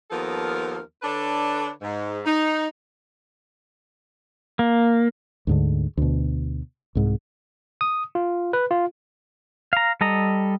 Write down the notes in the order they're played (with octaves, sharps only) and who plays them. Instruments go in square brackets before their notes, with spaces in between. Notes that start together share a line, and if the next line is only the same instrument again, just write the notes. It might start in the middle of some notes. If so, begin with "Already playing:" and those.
[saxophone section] D#2 F3 B3 A4 A#4
D3 D4 A4 B4 C#5 D5
G#2
D#4
[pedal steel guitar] A#3
[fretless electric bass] D2 G#2 D3
D2 B2
C2 G#2
[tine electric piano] D#6
F4
B4
F4
[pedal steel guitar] F5 A#5
G3 A4 D#5 A#5